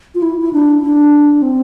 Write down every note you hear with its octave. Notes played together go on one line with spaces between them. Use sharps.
F4
E4
E4
D4
D4
C4